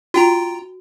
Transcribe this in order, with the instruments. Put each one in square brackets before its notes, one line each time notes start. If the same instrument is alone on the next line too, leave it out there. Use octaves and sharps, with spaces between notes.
[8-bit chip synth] F4 G5 A#5 [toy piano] F#4